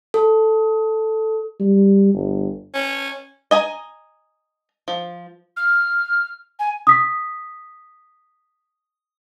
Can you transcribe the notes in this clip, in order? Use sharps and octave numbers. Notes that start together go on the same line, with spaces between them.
A4
G3
G1
C#4
D#5 G#5 A#5
F3
F6
G#5
D#6 B6